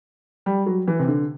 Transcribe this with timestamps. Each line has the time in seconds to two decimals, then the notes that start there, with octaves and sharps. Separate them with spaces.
0.46 G3
0.66 F#3
0.88 E3
0.99 C3
1.08 D3